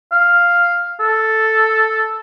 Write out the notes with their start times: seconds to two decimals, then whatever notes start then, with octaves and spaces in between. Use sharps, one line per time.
0.12 F5
1.00 A4